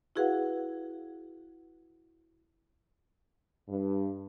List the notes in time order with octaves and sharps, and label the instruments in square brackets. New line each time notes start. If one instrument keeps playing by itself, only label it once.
[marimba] E4 F#4 G#4 B4 F5 F#5
[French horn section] G2